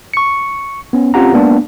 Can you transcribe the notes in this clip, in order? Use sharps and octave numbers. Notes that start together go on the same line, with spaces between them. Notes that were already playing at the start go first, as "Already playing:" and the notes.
C#6 C#7
B3 C#4
C4 C#4 F4 G4 F#5 A#5
G#3 A#3 B3 D4